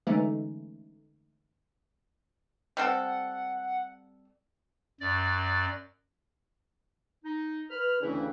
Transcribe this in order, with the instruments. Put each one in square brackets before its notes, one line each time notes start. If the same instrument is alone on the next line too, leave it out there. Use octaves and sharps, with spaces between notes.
[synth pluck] D3 E3 G#3 A3 C#4 D#4
[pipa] G3 C4 A4 [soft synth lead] F#5
[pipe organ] F#2 D5
[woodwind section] D#4
[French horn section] B4 [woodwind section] B5 F6
[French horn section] D2 C#3 D4 [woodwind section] E3 C4 E4